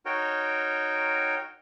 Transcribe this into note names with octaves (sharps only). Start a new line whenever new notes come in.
D#4 F#4 A#4 C#5 G5